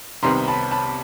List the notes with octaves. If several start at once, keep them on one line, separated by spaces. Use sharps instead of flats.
C2 C3 D#3 G3 B3 A#5 C6
A5 B5
A5 B5